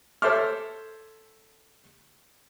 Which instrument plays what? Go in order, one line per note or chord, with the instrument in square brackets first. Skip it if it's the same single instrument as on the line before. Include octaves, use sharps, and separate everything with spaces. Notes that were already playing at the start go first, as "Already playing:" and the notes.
[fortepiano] A4 C5 C#5 E5 D6 F6